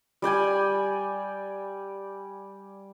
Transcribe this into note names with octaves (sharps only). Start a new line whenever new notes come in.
G3 D5 G5 G#5